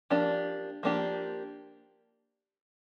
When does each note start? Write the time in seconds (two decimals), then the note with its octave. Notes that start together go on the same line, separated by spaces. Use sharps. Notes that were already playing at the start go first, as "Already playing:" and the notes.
0.10 F3 A#3 D4 G4
0.83 F3 A#3 D4 G4